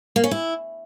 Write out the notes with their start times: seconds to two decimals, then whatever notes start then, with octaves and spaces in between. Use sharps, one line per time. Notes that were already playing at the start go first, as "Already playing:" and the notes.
0.16 A#3
0.24 C#4
0.31 E4